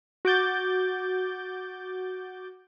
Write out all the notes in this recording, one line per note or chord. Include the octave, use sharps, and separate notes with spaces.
F#4 D6 G6 A6